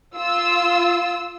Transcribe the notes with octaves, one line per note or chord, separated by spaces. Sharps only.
F4 E6